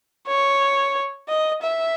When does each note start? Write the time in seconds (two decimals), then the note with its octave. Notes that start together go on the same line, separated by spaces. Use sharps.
0.27 C#5
1.29 D#5
1.62 E5